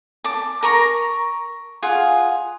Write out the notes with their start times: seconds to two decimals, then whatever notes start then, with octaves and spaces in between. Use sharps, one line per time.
0.24 A5 D6
0.63 A#4 A#5 C#6
1.83 F4 G#4 F#5